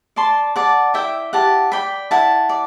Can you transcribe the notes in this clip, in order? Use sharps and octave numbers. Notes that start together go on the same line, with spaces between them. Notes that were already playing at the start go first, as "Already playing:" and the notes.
D5 A5 C6
D5 F#5 A5
E4 E5 G5
G4 F#5 A5
D5 G5 B5
E4 F#5 A5
D5